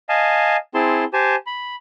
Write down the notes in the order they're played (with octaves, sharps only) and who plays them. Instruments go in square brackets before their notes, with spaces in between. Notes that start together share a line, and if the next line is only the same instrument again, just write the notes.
[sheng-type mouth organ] D#5 F5 G#5 A5
C4 E4 G#4 A5 C6
G4 C5 G#5 A5
B5